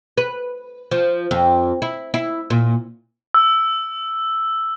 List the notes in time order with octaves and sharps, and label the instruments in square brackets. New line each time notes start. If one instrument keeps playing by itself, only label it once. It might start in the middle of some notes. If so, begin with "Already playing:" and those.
[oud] B4
F3
F2
E4
E4
A#2
[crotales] E6